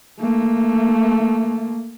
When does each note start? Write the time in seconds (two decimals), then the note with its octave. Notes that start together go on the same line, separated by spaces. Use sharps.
0.20 A3 A#3